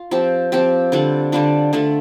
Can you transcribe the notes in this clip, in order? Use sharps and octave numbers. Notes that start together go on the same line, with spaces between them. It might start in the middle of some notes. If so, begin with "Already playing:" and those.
Already playing: F4
F3 C4 G4
F3 C4 G4
D3 G3 D4 F4
D3 G3 D4 F4
D3 A3 D4 F4